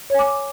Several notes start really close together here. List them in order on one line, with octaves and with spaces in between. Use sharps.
C#5 G#5 D6